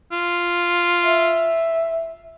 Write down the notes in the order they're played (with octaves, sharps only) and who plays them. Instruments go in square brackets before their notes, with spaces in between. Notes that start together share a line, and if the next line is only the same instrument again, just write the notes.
[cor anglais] F4
[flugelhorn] E5